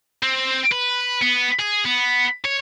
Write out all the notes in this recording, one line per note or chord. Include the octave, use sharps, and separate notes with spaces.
C4
B4
B3
G#4
B3
C#5